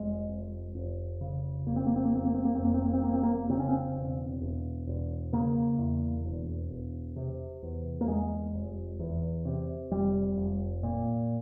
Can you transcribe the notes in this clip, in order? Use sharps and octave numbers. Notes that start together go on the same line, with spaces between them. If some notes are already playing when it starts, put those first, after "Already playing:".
Already playing: F1 G#3
F1
F1
C#3
F1 A#3
C4
A#3
C4
A#3
F2 C4
A#3
C4
A#3
F1 C4
A#3
C4
A#3
C4
F1 A#3
C4
A#3
C#3 C4
C#4
C4
E1
E1
E1
C#3 A#3
E2
E1
E1
C3
E2
A#3
E2 G#3
F1
E2
C3
F1 G3
F1
A#2